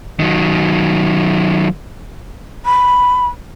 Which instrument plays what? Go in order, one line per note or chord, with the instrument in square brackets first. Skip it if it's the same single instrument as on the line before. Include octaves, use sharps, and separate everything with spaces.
[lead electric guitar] D#3 F#3
[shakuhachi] B5